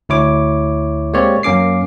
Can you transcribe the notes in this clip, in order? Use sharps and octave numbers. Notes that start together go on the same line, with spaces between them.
D2 E4 C#5 D6
G#3 A#3 C4 G4 C#5 D5
F#2 A#3 C#4 D6 C7